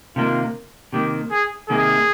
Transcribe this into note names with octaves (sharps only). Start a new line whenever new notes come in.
C3 D#3 A#3 F4
C3 D#3 A#3 G4
G#4
C3 D#3 A#3 G#4